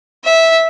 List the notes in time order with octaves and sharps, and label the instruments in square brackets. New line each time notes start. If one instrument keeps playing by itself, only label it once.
[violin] E5